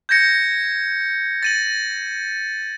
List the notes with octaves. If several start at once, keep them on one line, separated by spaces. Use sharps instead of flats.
G6 G#6 A#6 C#7
A6 D#7 F#7